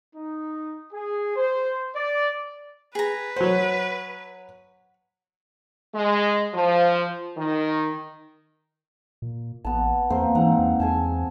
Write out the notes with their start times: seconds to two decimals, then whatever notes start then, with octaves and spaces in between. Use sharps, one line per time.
0.15 D#4
0.93 G#4
1.36 C5
1.94 D5
2.95 G#4 B4 A#5
3.36 F#3 C5 F#5
5.94 G#3
6.53 F3
7.37 D#3
9.22 A#2
9.65 A1 B3 A5
10.10 E2 A#3 C4 C5
10.35 G#2 E3 F#5 A#5
10.59 E2
10.80 E2 G#4 G#5 A5